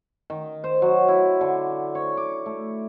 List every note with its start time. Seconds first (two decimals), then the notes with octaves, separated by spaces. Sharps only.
0.30 D#3
0.64 C5
0.82 F#3
1.08 E4
1.41 D3
1.95 C#5
2.17 D6
2.46 A3